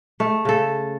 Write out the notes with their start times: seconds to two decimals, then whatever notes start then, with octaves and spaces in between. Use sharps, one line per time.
0.20 A3
0.45 C#3 A4